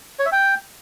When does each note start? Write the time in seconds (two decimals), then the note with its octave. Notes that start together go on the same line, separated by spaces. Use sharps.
0.19 C#5
0.26 E5
0.32 G5